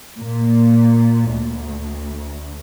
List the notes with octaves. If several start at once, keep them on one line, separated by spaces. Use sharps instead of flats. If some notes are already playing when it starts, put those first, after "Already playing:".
A#2
D2